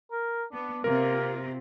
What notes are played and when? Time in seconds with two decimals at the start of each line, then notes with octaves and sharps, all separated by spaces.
0.11 A#4
0.53 B3 D4
0.84 C3 A#3 F4 A#4